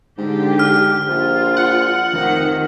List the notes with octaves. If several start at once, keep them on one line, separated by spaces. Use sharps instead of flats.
G#2 D3 G4
F6
A#1 F4
F#5
F1 D#3